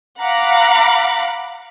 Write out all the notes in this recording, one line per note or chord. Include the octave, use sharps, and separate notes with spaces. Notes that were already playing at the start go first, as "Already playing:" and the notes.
F5 F#5 A#5 B5 D6